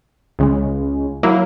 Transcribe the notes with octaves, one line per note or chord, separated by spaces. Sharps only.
C#2 C#3 G#3
F#3 A#3 E4